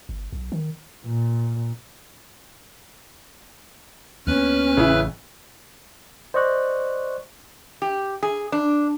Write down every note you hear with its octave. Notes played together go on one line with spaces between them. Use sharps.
G1
B1
D#3
A#2
D2 A#3 B3 C#4 B4 F6 F#6
A1 C#3 E4
C5 D5 D#5 C#6 F#6
G4
G#4
D4